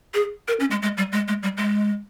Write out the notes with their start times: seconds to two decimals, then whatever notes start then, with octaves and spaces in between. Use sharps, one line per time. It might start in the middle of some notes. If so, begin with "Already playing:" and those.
0.14 G#4
0.48 A#4
0.60 C#4
0.71 G#3
0.82 G#3
0.97 G3
1.12 G#3
1.28 G#3
1.43 G3
1.58 G#3